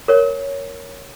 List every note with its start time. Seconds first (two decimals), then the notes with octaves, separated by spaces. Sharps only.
0.08 A#4 C#5